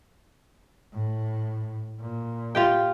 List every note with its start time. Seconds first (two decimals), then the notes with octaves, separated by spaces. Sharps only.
0.94 A2
2.00 A#2
2.55 F4 G4 G5